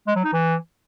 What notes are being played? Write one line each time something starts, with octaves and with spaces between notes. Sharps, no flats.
G#3
F#3
D#4
E3